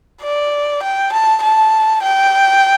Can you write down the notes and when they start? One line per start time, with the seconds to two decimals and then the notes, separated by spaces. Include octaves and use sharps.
0.22 D5
0.83 G5
1.12 A5
1.42 A5
2.02 G5